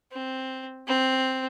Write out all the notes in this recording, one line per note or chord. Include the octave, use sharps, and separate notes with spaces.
C4
C4